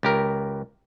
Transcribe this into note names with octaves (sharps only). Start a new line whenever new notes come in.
C#2 G4 A#4